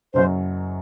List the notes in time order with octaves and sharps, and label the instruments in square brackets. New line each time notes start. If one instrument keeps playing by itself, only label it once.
[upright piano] F#1 F#2 F#3 [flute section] C5